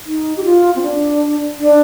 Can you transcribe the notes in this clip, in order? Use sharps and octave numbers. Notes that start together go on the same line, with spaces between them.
D#4
G4
F4
C4
D4
D4